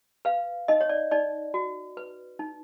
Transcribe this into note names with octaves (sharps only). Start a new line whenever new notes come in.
B4 F5
D#4 D#5
C#5
D5
D#4 D5
F#4
B4
D#4